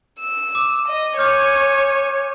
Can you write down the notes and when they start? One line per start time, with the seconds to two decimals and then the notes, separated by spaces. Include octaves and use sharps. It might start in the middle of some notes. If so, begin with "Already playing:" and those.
0.20 E6
0.55 D6
0.88 D#5
1.17 C#5 G#5 D6 F6 G6